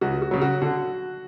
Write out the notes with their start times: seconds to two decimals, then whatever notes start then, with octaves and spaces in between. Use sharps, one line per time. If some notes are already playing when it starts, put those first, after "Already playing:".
0.01 C#2 F#4
0.22 F#4
0.31 C#3 F#3
0.41 F#4
0.62 D3 F#4